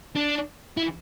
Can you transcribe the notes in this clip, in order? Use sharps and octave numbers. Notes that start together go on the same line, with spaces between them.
D4
E4